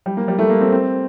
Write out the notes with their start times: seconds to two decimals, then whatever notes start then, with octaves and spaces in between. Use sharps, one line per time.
0.06 G3
0.17 A#3
0.28 G3
0.39 A3
0.50 A#3
0.61 C4
0.72 C4